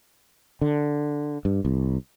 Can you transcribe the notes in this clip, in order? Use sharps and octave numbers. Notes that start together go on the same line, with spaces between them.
D3
G2
C2